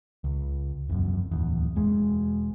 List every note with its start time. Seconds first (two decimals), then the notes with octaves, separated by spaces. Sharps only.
0.24 C#2
0.89 E1 F#2
1.31 D1 E2
1.76 E1 G#3